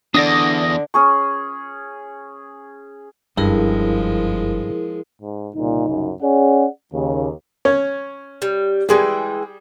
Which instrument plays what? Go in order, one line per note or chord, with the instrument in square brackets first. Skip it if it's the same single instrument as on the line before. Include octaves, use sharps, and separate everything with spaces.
[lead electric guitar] E2 [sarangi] D3 [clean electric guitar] D4 D5 [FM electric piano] D#6 A#6
[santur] C#4 G#4 C#6
[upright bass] F#1 [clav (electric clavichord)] G2 [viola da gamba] F3 G#3 [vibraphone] E4 G#4 A#4
[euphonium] G#2
[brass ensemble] C2 C#3 D#4 [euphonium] A#2
[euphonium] F#2
[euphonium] C#4 [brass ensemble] G#4 D5 F#5
[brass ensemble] D#2 [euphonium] C#3
[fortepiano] C#4 C#5
[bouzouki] G3
[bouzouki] E3 G#3 G5 [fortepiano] G3 G#4